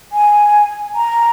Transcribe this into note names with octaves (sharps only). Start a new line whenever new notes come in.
G#5
A#5